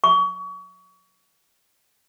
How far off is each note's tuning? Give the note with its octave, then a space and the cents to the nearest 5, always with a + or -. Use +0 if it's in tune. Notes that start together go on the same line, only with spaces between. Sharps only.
C#6 +30